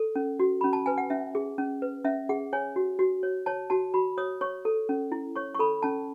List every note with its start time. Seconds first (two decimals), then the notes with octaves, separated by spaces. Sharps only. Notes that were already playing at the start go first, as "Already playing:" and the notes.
Already playing: A4
0.15 C#4
0.39 F#4
0.61 C#4 B5
0.73 A5
0.86 B4 G#5
0.98 F#5
1.10 C#4 E5
1.35 G#4
1.58 C#4
1.82 B4
2.04 C#4 E5
2.29 G#4 F#5
2.53 C#5 G#5
2.76 F#4
2.99 F#4
3.23 C#5
3.46 C#5 A5
3.70 F#4 A5
3.94 F#4 B5
4.18 C#5 D#6
4.41 C#5 C#6
4.65 A4
4.89 C#4
5.12 E4
5.36 C#5 C#6
5.55 C#6
5.59 A4 B5
5.83 C#4 A5